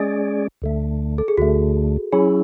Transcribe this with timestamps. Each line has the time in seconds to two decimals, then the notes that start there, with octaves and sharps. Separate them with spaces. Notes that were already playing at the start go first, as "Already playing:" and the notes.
Already playing: G#3 C#4 G#4 D5
0.62 D2 D3 A3
1.18 A4
1.28 G#4
1.37 D2 D3 A3 F#4
2.13 F#3 C#4 E4 G#4